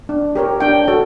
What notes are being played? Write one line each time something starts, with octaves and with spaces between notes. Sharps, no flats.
D4
G4 A#4 C#5
D4 G5
F#4 A4 C#5